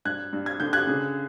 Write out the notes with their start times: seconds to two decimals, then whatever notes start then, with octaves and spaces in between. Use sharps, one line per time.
0.05 G2 F#6 G#6
0.33 G2
0.46 G#6
0.60 D3 G6
0.73 F#6 G#6
0.87 C#3